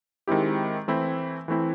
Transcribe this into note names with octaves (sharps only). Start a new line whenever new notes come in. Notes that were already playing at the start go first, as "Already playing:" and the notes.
D#3 G#3 C4 E4 G4
E3 A3 C4 E4
E3 A3 C4 E4